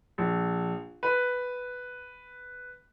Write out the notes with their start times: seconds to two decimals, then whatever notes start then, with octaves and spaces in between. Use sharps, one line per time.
0.18 A#1
1.03 B4